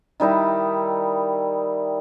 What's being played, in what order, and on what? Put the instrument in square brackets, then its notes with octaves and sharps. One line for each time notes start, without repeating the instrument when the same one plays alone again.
[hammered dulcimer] D#3 G3 D#4 E4